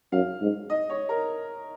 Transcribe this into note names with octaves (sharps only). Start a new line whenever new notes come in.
F#2 F5
G#2
D#5
C#5
A#4